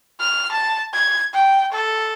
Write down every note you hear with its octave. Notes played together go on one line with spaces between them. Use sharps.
F6
A5
G#6
G5
A4